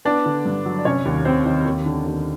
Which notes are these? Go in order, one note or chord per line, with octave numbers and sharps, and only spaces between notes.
B3 D4 D5
D3
G2
F#3
D5
F1 C#4 C#5
D#2
F1 C4 C5
D#3
D#2
D3
D#2